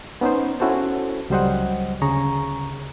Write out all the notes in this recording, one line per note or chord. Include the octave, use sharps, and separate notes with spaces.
B3 C#4 D#4 B4 C5
C#4 E4 F#4 A4 C5
C#2 F#3 G3 C5 D#5 F#5
D2 C#3 G#4 A#5 C#6